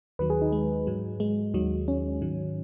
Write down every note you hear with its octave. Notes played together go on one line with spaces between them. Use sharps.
D#2 D#3 F#3 B4
G#4
D#4
G#3
G#2 F#3
G#3
D#2 D#3 F#3
C#4
G#2 D#3 F#3